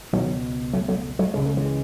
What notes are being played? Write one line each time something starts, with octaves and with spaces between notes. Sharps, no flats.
C#2 B2 D#3 F#3
F#3 A3
F#3 A3
F#3 A3
C#2 C#3 G#3
A3
E3 G#3